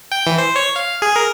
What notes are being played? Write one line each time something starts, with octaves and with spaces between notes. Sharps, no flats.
G5
E3
C5
C#5
F5
G#4
A#4